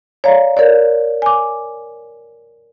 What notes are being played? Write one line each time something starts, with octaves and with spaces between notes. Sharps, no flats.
C#5 D5 F5 A#5
A#4 C#5 D5
G#5 D6